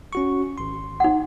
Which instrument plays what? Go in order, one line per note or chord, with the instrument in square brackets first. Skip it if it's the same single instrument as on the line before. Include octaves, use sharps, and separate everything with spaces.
[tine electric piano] C#4 F#4 C#6
G#1 C6
[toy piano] D#4 F#5